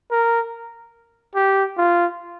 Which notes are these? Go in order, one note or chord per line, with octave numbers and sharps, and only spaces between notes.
A#4
G4
F4